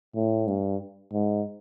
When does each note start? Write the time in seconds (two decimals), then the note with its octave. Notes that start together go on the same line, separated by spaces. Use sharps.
0.15 A2
0.47 G2
1.13 G#2